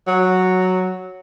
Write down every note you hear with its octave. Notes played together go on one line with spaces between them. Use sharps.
F#3